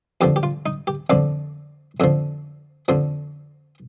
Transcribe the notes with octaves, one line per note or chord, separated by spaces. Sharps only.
F2 D3 F3 G4
G4
F4
D#4
G4
F2 D3 F3 D5
F2 D3 F3
F2 D3 F3